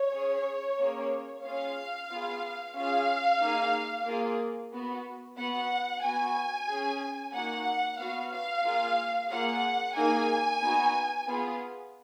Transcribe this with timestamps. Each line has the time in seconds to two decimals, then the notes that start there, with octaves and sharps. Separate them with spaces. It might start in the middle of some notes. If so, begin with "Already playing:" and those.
Already playing: C#5
0.14 C#4 G#4
0.78 A#3 C#4 G#4
1.44 C#4 F4 G#4 F5
2.10 B3 F4 G#4
2.75 C#4 F4 G#4 F5
3.41 A#3 D#4 G#4
4.06 A#3 F4 G#4
4.73 B3 F#4
5.38 B3 F#4 F#5
6.03 B3 F#4 G#5
6.69 C#4 G#4
7.34 A#3 D#4 F#4 F#5
7.99 B3 F#4 F5
8.33 F5
8.65 A#3 F4 G#4
9.31 A#3 F4 G#4 F#5
9.96 A#3 D#4 G#4 G#5
10.62 B3 D#4 F#4
11.27 B3 F4 G#4